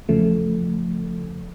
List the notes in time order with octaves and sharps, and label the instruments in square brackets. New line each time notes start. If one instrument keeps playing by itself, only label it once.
[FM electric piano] E2 C#3 F3 A3